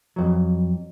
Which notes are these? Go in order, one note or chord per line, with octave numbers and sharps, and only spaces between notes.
F2 F#3